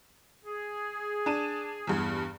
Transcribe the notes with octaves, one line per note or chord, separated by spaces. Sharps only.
G#4
D4 A5 D#7
E2 G2